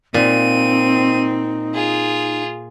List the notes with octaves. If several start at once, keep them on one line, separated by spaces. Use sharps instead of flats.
A#2 C4 D#4 D#7
F4 G#4